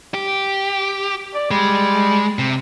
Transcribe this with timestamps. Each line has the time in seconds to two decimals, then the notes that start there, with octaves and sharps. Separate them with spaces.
0.14 G4
1.34 D5
1.51 G3 G#3
2.39 C3